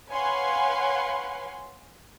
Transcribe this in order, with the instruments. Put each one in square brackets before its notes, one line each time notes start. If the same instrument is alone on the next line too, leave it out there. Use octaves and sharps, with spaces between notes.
[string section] B4 C#5 F5 F#5 G#5 C6